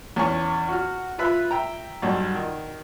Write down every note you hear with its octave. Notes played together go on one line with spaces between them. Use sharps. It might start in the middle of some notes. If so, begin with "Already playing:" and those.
E2 C#4 G#5 C#6
F#4 F6
F4 B4 E5 B5
E5 G5 A#5
B1 G2
D#3